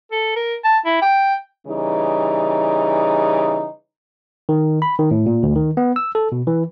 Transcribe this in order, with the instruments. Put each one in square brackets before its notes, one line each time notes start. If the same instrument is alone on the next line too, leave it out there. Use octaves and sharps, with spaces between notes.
[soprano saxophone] A4
A#4
A5
E4
G5
[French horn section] C#3 E3 G3 D#4
[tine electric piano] D#3
B5
D#3
A2
A#2
D2
D#3
B3
E6
A4
B2
E3